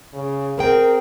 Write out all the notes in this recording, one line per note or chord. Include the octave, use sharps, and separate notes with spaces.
C#3
C4 G#4 A#4 G5